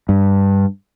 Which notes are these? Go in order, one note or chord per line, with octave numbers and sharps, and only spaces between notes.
G2